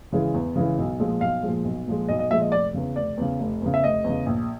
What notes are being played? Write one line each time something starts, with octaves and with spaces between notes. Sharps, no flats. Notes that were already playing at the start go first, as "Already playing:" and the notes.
C#3 E3 G#3
E2
C#3 E3 G#3
B1
A#2 F3 G#3
B1 F5
A#2 F3 G#3
B1
A#2 F3 G#3
B1 D#5
D#5
A#2 F3 G#3 E5
D#5
F1 D5
E2 C#3
F1 D5
E2 C#3
F1
E2 C#3
E5
F1 D#5
E2 C#3
A#1